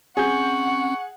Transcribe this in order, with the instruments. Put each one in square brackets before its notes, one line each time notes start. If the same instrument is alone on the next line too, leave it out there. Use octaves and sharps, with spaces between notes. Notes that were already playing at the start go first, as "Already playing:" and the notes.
[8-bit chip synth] C4 C#4 [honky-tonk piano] G#4 G6 [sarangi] F#5 [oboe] C#6